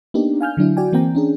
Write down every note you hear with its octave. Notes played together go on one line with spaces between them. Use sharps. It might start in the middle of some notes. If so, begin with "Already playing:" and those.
A#3 B3 D4 D#4 G4
F5 G#5 F6 G6
D3 F#3 D4 E4
F#4 D5 G5 G#5
E3 A#3 C4 G5 A#5
C#4 D4 G#4